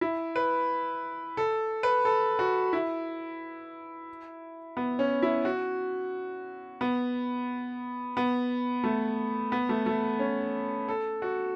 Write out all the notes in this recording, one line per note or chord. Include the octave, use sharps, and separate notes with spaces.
E4
B4
A4
B4
A4
F#4
E4
B3
C#4
E4
F#4
B3
B3
A3
B3
A3
A3
C#4
A4
F#4